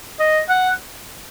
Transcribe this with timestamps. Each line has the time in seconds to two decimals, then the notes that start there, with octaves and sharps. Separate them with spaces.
0.19 D#5
0.49 F#5